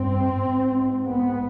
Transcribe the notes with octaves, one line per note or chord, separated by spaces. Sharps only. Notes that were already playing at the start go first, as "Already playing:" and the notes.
Already playing: G2 C4
G#2
B3